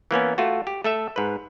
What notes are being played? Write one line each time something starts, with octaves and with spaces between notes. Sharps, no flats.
E3 A#3 B3 C#4
A3 F4 F#4
G4
A3 A4 E5
G#2 B4